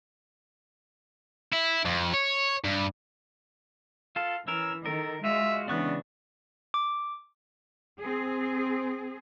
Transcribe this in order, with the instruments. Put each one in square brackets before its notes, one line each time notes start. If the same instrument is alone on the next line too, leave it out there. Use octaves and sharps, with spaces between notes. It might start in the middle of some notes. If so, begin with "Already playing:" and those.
[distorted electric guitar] E4
F2
C#5
G2
[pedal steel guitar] F4 A4 [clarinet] F5
[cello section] E3 [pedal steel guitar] C#4 A#4 [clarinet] E6
[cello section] D#3 [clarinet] A4 [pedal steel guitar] A#4
[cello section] G#3 [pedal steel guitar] F4 F#4 [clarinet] E5
[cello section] C#3 E3 D4 [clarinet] B3 [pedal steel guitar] D5 C#6 F#6
[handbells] D6
[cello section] C4 G#4